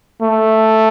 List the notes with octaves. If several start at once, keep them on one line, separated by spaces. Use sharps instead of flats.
A3